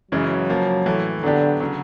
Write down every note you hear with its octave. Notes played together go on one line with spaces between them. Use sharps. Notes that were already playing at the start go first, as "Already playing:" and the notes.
F#2 C#3 E3 F#3 G#3 C#4
C#3 F3 A#3
A2 E3 A3
D3 F#3 B3 D4 G4
C#3 F#3